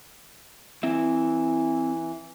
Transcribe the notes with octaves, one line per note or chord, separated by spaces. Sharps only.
E3 C4 E4 E5